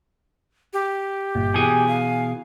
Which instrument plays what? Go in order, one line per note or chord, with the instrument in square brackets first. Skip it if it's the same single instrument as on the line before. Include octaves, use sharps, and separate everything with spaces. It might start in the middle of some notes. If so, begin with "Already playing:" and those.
[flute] G4
[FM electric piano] G1 A#2
[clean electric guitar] B2 E3 G#4 [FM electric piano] G#5
[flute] F5